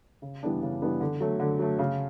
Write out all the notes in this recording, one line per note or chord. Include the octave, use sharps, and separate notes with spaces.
C#3
E3 G3 B3 D4
C#3
E3 G3 B3 D4
D3
F#3 A3
D3
F#3 A3
C#3